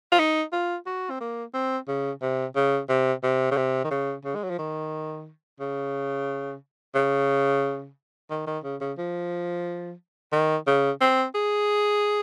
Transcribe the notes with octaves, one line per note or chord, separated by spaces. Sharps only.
F4
D#4
F4
F#4
C4
A#3
C4
C#3
C3
C#3
C3
C3
C#3
C3
D#3
C#3
C#3
G#3
F#3
F3
D#3
C#3
C#3
D#3
D#3
C#3
C#3
F3
D#3
C#3
C4
G#4